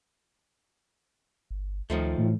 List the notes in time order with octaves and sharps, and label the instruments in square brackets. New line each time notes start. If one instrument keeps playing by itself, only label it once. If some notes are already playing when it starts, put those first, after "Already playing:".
[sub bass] G1
[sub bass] D2 [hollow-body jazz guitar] D#3 F3 A3
[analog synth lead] A2 [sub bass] E3